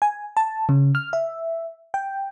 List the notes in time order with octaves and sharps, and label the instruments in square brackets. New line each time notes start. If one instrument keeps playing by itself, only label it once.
[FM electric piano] G#5
A5
C#3
F6
E5
G5